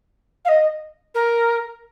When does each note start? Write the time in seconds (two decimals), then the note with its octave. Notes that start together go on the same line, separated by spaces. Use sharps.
0.45 F5
0.48 D#5
1.14 A#4